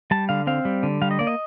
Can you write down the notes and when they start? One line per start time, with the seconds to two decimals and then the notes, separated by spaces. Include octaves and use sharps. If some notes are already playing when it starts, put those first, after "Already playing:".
0.11 G3 A5
0.29 D3 F5
0.47 C4 F5
0.65 G3
0.83 D3
1.02 G3 F5
1.11 D#5
1.19 A#3 D5
1.27 D#5